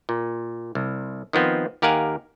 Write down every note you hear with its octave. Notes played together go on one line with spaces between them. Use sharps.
A#2
C2
D#3 F3 B3 C4
D#2 G4 A#4 F5 F#5 G#5